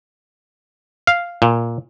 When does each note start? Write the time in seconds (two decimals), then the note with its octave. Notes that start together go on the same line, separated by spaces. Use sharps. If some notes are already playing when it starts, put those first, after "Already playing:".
1.07 F5
1.42 A#2